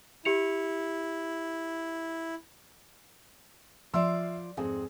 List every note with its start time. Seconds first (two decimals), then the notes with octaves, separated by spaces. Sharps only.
0.25 E4 G4 C#7 F7
3.94 F3 F4 D5 E5 C6 E6
4.57 F2 G#2 C4 G#4